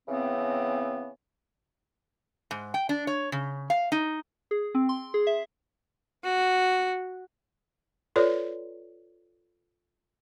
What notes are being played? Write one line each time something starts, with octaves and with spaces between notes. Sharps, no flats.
C#3 E3 B3 C4
G#2
G5
D4
C#5
C#3
F5
D#4
G#4
C4
C6
G#4
E5
F#4
F4 A4 B4 C#5 D5